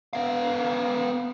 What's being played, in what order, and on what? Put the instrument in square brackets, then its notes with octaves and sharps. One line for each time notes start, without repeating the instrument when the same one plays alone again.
[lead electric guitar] B3 F5